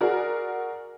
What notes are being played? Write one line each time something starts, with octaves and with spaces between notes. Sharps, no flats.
F#4 G#4 A#4 D5